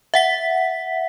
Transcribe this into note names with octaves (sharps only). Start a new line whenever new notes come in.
E5 F#5 B6